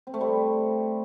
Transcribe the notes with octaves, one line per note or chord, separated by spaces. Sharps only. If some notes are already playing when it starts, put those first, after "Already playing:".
C4
A3
G3